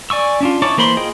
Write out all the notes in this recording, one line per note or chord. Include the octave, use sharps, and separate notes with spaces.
D5 G#5 C#6 E6
C#4 D4 F4
D#4 E4 C#5 A5 D6
E3 A#3 C5 B5 C6
F4 G#4 D#5 G5